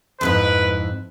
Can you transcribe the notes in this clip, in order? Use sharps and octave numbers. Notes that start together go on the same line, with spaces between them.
F2 G#2 E4 B4